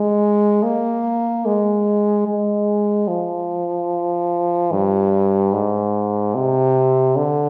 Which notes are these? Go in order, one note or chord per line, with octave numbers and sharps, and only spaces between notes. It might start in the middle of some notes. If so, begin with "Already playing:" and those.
Already playing: G#3
A#3
G#3
G#3
F3
G2
G#2
C3
D3